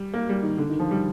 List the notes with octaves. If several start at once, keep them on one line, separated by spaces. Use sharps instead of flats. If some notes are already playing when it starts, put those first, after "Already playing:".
Already playing: G3
A#3
G3
D#3
D3
D#3
F3
G3